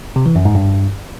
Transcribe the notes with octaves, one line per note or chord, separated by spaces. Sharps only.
C3
E3
F#2
G#2
G2